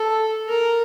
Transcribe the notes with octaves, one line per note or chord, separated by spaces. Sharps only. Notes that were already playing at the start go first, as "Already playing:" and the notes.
Already playing: A4
A#4